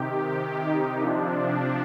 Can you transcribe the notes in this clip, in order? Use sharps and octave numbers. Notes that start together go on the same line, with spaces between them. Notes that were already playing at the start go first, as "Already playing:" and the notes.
Already playing: C3 D#3 G4
D#4
C3 F3 D4